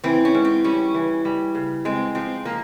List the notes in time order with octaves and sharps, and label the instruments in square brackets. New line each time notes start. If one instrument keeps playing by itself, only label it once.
[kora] E3 [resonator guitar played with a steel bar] C4
[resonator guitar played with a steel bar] C#4
[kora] G#2
[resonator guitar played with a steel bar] C4
[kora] G3 [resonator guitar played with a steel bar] C#4
[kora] E3
G3
C#3
[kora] G#3 [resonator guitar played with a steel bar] C4
[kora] F3 [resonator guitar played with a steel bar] C4
[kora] F3 [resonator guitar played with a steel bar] A#3